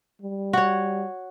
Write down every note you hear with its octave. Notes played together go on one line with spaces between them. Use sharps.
G3
F#4 C#5